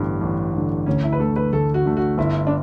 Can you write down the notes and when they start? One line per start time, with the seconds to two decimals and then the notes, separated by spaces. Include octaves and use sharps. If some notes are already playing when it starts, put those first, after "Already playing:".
Already playing: A1 G2 D3 B3
0.21 A1
0.54 G2 D3
0.86 D2 C#4
1.03 E4
1.13 B4
1.19 D3 A3 A4
1.36 B4
1.53 D2 A4
1.74 F#4
1.86 D3 A3
1.97 F#4
2.18 G1 E4
2.47 D4